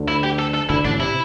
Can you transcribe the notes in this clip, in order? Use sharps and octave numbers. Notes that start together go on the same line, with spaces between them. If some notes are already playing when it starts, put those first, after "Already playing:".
Already playing: D2 D3
E4
G4
A4
A4
D2 D3 E4
A1 A2 D4
C3 E4